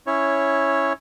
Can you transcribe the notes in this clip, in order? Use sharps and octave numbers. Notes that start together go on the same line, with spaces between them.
C#4 E4 C#5